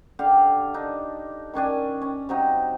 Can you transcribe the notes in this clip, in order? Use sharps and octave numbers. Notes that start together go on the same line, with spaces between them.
D3 G4 A4 F5
D4 D#4
D#3 C#4 D4 G#5
C#4
C3 F#3 D#4